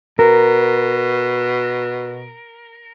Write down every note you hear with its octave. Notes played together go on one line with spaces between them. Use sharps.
B2 A#4